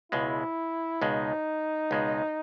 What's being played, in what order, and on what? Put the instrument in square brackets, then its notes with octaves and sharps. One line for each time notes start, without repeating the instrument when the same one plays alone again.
[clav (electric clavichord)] C#2 B2 G#3 [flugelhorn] E4
[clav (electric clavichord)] C#2 B2 G#3 [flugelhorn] D#4
[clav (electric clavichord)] C#2 B2 G#3